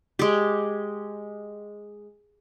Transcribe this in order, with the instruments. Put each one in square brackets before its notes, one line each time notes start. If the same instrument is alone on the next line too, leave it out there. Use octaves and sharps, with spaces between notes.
[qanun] G#3 G4